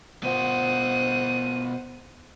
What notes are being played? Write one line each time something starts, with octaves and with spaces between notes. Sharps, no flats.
B2 F4 C5 F#5 D#7